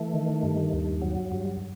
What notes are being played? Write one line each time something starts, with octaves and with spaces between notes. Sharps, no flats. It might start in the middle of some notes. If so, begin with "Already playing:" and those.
Already playing: E3 A3
D#3
G2
D#2
F#3
G2